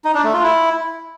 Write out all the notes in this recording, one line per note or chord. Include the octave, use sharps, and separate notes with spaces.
D#4
D4
A3
F4
E4